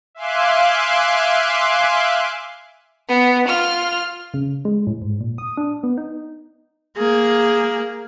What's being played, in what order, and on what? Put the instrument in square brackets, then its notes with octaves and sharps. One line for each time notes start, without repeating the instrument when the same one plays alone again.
[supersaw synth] E5 F5 G#5 C6 D6 F#6
[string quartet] B3
F4 F6
[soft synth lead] C#3
G#3
A2
G#2
A#2
D#6
D4
B3
D#4
[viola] A#3 G#4